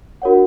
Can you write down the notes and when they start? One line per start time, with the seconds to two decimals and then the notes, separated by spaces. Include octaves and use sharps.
0.22 D4 F#4 A#4 C#5 F#5